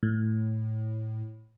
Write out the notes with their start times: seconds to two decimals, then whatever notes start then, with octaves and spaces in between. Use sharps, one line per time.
0.03 A2